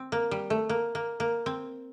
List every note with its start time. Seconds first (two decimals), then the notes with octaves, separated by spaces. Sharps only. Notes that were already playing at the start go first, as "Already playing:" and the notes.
Already playing: C4
0.12 A#3
0.31 G3
0.50 A3
0.69 A#3
0.95 A#3
1.20 A#3
1.46 C4